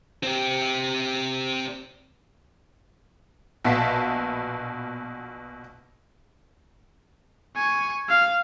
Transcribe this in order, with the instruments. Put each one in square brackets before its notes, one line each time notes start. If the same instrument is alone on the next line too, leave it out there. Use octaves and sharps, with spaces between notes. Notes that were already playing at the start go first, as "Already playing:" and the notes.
[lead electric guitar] C4 G4
[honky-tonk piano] A#1 B2 B3 F5 A5 B6
[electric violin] G#5 C#6
F5